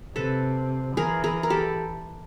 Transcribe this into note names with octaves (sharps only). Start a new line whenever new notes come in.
C3 A4 B4
E3 G#4 A#4
G#4 A#4
A#4
G4 A4